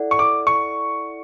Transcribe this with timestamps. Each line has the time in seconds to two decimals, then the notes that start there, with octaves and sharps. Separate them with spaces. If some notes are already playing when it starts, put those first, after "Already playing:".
Already playing: E4 A4 D5 F#5
0.11 C#6
0.19 D6
0.47 C#6